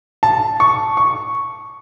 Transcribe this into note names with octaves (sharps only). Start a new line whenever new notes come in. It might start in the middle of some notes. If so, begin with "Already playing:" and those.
A5
C#6
C#6